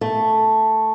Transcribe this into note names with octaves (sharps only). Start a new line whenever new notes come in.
A3